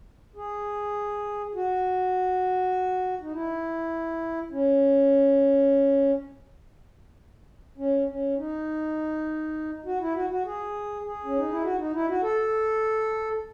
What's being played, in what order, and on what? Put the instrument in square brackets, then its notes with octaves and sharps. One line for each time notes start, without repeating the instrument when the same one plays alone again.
[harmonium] G#4
F#4
D#4
E4
C#4
C#4
C#4
D#4
F#4
E4
F#4
F#4
G#4
G#4
C#4
D#4
E4
F#4
D#4
E4
F#4
A4